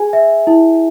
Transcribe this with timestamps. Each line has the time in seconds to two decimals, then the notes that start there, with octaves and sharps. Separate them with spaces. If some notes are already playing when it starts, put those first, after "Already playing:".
Already playing: G#4 G#5
0.13 E5
0.47 E4